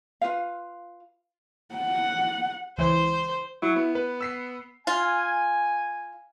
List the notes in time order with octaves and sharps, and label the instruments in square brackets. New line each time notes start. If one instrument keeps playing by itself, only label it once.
[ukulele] F4 B4 F5
[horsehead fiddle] F#5
[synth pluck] C#2 E3 [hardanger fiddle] C5
[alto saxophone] F#3 [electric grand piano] E4
[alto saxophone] B3
[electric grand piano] B4
E6 B6 C7
[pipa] F4 [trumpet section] G#5